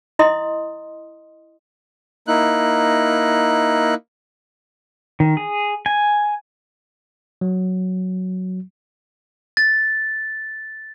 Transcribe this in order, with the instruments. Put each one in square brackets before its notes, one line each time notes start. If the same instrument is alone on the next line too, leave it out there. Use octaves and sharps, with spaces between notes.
[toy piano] E4 D#5 C6 D#6
[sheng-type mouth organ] A#3 D#4 E4 F#6
[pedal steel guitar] D#3
G#4
G#5
[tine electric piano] F#3
[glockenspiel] A6